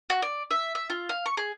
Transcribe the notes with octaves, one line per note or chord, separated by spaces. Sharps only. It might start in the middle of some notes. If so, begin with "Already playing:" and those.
F#4
D5
E5
E5
F4
F5
C#6
G#4